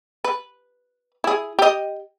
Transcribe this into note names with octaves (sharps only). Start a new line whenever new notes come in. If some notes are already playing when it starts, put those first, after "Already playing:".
B4
E4 G#4
G4 D#5